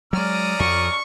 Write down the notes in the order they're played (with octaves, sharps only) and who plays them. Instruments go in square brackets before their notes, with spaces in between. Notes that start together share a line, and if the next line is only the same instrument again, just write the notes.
[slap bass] F#3 G#3 [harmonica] C#4 A#5 F6 [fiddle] D5 D#6
[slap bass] F2 [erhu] C#6